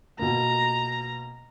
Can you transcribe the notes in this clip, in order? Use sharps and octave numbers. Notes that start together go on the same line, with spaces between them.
B2 A#3 A#5